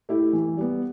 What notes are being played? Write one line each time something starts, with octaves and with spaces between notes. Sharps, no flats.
A3 E4 G4
E3
G3 B3